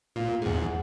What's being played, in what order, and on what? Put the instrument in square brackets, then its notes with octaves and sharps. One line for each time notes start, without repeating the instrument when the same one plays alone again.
[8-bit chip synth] A#2 [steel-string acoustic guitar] F4
[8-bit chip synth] E2 G#2 [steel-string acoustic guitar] G#4 F#5